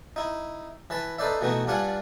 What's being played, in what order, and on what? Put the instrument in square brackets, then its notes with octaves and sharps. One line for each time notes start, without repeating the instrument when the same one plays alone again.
[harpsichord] D#4 E4
E3 B4 A5 B5
D#4 A4 B4 C5 D5 E5
B2 E3 A3 D#4 F#4
G2 G3 D4 F4 F#5 G#5